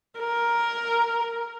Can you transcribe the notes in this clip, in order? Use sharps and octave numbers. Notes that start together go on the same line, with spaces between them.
A#4